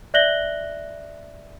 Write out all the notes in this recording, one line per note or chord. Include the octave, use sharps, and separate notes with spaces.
D5 E5 F#6 A#6 F#7 G7